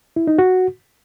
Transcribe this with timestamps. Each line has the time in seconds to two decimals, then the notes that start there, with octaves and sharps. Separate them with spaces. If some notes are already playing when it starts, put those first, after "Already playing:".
0.16 E4
0.27 D#4
0.39 F#4